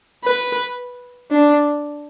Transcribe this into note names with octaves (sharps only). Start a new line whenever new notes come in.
B4
D4